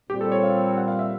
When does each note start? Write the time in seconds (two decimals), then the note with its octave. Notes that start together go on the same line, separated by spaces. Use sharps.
0.09 A#2 G3 C4 G4
0.21 A4
0.32 C#5
0.43 F5
0.77 F#5
0.88 F5
0.99 E5